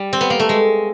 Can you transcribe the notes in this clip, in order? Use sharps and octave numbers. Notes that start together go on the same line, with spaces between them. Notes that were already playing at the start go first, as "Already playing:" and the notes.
Already playing: G3
C4
B3
A#3
A3
G#3